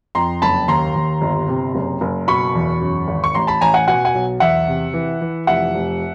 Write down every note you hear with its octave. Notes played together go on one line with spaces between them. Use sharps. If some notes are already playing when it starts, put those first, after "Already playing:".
F2 A#5 C6
F#1 A5 B5
D#2 A#5 C6
D#2
G1
C3
F#1
F#1
B2 B5 C#6
E2
F#2
G#1
C#6
A1 A#5 C6
A5 B5
A1 G#5 A#5
F#5 G#5
B2 F#5 G#5
F#5 G#5
B1
E2 E5 F#5
C3
E3
E3
F1 E5 F#5
F1